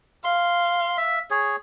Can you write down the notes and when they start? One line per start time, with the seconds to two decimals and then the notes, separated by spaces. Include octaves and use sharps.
0.24 F5 C6
0.98 E5
1.31 G#4 C#5